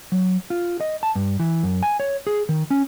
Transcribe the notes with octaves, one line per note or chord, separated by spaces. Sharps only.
F#3
F4
D#5
A5
G2
E3
F#2
G#5
C#5
G#4
D#3
C#4